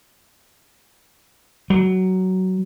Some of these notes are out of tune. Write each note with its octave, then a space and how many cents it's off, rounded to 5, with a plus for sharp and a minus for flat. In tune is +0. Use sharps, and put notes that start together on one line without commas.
F#3 +15